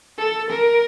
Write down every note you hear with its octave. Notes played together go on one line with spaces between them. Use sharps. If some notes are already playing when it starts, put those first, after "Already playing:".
A4
A#4